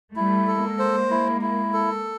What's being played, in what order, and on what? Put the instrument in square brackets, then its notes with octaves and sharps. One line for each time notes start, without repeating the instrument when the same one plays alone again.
[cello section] G3 A3 [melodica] E4
[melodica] A4
[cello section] G#3 A#3
[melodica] C5
E4
E4
A4